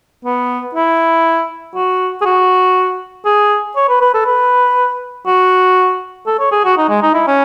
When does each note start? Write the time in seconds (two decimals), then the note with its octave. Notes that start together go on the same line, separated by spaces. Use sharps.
0.25 B3
0.75 E4
1.75 F#4
2.22 G#4
2.25 F#4
3.25 G#4
3.76 C#5
3.89 B4
4.01 B4
4.14 A4
4.26 B4
5.27 F#4
6.27 A4
6.39 C#5
6.52 G#4
6.65 F#4
6.77 D#4
6.89 G#3
7.02 D#4
7.14 E4
7.27 C#4